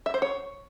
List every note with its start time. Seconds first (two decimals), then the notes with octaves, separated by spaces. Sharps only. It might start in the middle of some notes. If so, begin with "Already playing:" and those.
0.06 E5
0.14 C5
0.22 C#5